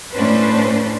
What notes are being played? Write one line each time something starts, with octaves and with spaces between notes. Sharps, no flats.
A2 A3 C#4 D4 B4 C5